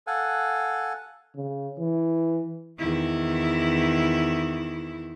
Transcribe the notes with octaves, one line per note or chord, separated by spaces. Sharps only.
A4 F5 F#5 G#5
C#3
E3
E2 D#3 E4